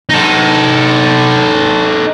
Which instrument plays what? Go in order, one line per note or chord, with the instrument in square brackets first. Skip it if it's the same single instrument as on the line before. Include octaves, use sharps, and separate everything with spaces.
[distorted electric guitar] D#4 A4